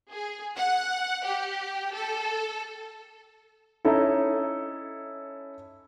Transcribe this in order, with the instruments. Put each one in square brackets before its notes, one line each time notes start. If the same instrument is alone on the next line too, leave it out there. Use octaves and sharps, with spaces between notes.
[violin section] G#4
F#5
G4
A4
[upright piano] C#4 D#4 E4 A4